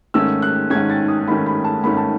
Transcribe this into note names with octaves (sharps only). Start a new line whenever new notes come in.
G#2 D#3 A3 C#4 E6
F#6
G#2 D#3 A3 C#4 G#6
A6
D#6
G#2 D#3 A3 C#4 B5
B5
A5
G#2 D#3 A3 C#4 B5
A5